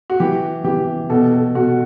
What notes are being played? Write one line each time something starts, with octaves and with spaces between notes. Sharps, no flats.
F#4
E3 G4
E3 G4
B2 A4
A4
B2 F#4